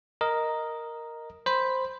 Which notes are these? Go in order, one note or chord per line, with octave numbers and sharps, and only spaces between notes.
A#4 D#5
C5 B5